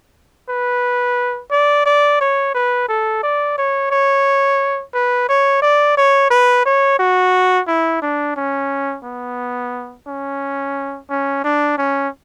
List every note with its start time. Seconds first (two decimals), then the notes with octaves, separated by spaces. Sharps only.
0.49 B4
1.51 D5
1.86 D5
2.21 C#5
2.55 B4
2.89 A4
3.23 D5
3.58 C#5
3.91 C#5
4.94 B4
5.29 C#5
5.62 D5
5.97 C#5
6.30 B4
6.66 C#5
6.99 F#4
7.68 E4
8.02 D4
8.36 C#4
9.04 B3
10.07 C#4
11.10 C#4
11.44 D4
11.78 C#4